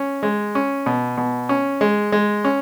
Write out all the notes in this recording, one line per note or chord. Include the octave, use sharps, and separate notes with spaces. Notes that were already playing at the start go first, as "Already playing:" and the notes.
Already playing: C#4
G#3
C#4
B2
B2
C#4
G#3
G#3
C#4